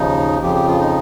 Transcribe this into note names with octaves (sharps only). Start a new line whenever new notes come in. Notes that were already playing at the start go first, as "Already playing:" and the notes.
Already playing: D#2 C#3 F3 D#4
F2 C#3 F3 G4
G4
F4
D#4